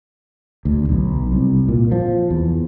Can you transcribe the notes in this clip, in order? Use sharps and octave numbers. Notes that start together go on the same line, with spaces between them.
D2
B1
C2
A#2
F3
E2